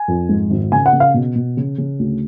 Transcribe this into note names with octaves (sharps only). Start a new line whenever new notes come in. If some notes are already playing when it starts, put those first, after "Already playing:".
Already playing: G#5
F2
G#2
G#1
C#3 G#5
F#5
C#3
F5
B2
B2
C#3
C#3
D2